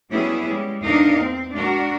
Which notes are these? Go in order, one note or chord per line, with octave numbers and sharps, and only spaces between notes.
F#3 G3 B3 C#4 E4 G#4
G3 G#3
E2 D4 D#4 A#4 D#5 F5
C4
G#3 D4 F#4 A#4